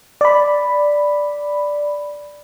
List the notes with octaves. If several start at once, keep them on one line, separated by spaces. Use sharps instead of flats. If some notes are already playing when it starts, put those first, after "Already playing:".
D5 B5